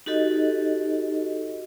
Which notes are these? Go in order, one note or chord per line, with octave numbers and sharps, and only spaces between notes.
D#4 F#4 G4 A4 D#5